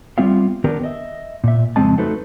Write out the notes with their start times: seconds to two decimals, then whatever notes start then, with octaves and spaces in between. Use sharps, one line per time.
0.18 G3 B3 C4 F4 E5 F5
0.64 D#3 B3 D4 G4 A#4 B4
0.83 D#5 E5
1.44 A#2 E5
1.76 F2 C#3 G#3 C4 D#5 A5
1.98 F#3 A3 D#4 A4 B4 C5